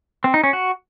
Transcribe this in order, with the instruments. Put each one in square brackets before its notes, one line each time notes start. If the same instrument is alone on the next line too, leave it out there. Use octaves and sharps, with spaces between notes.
[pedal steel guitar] C4
D#4
C#4
F#4